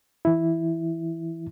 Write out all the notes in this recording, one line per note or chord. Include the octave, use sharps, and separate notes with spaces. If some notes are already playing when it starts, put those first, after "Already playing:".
E3 E4